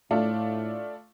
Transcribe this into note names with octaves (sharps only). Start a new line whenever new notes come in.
A2 A3 D4 F4